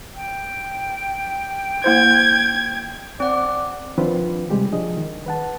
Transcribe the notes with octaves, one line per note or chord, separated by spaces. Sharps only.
G5
A#3 E4 C5 G6 G#6
C4 D5 F#5
D#3 F3 C4 D4 F4 B4
C3 G3 G#3 G4
F3 D4 G#4 D#5
D#3
B4 F#5 A5